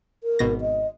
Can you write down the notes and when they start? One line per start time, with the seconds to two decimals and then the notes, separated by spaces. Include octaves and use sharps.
0.24 A#4
0.39 G#1 B2 A#6
0.61 D#5